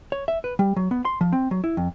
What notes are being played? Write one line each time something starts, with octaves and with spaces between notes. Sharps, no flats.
C#5
E5
B4
G3
F#3
B3
C6
F3
C4
F#3
E4
F2